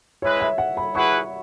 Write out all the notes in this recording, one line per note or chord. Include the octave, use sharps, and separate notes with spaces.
G#3 E4 B4 C#5
E5
F#5
B5
E4 G#4 B4 F#5 C#6